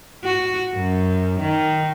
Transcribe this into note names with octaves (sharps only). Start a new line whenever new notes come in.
F#4
F#2
D#3